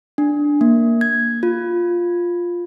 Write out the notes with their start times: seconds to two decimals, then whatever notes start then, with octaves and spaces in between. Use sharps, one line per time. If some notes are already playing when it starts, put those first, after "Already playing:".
0.18 D4
0.61 A#3
1.01 G#6
1.43 F4